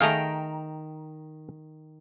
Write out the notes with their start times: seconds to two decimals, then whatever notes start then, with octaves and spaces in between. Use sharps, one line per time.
0.01 D#3 A3 G#4 F5 G5 A#5